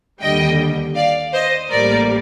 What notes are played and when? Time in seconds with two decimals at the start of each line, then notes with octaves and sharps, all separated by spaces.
0.21 D#2 D3 G3 D#5 G5
0.95 D5 F5
1.34 C5 D#5
1.71 A1 A2 G3 A#3 A#4 D5